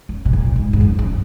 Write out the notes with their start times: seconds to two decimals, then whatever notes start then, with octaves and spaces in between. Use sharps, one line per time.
0.09 F#2
0.25 B2
0.33 A#2
0.56 G#2
0.73 G#2
0.81 F#2
0.99 F#2